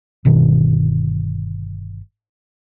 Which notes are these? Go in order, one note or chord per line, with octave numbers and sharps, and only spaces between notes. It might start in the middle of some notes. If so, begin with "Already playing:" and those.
G1 B2 D#3